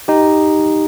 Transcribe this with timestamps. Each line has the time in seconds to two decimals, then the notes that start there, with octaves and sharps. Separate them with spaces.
0.08 D#4 G4